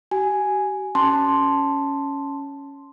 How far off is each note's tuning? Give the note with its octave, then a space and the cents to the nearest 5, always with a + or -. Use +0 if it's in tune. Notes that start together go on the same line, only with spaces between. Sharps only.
G4 -45 G#5 +0
C#4 +0 A5 +0 C6 +0